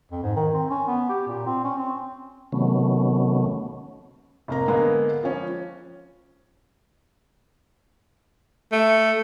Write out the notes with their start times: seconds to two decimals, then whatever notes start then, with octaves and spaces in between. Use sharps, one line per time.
0.11 F2
0.23 G#2
0.36 D#3
0.53 C4
0.70 C#4
0.87 B3
1.09 G4
1.27 A#2
1.46 C4
1.64 C#4
1.77 C4
2.52 C3 D#3 F#3 A3 B3 C#4
4.48 F1 A#3 A#5
4.68 D3 G#3 A#3 B3
5.23 F3 C#4
8.72 A3